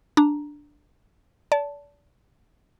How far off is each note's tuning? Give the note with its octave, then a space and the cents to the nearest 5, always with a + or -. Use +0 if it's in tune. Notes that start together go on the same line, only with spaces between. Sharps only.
D4 +0 A#5 +0
D5 -35 A5 +0